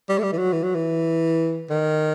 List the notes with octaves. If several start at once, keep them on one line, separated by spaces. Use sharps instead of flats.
G3
A3
G3
E3
F#3
E3
F#3
E3
D#3